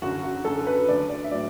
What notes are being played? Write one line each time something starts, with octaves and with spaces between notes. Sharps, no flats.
F#2 D3 F#3 F#4
F#4
F#2 D3 F#3 A4
B4
D2 D3 F#3 D5
D5
E5
A2 F#3 D5